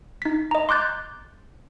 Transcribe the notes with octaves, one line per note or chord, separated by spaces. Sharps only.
D#4 B6
D#5 A#5
C6 D6 F#6 G6 A6